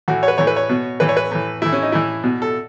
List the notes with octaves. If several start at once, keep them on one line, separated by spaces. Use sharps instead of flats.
A2 E3 F#4
C#5
B4
A2 E3 C#5
B4
C#5
B2
A2 E3 B4
C#5
B4
A2 E3
A2 E3 E4
C#4
D#4
A2 E3 E4
B2
A4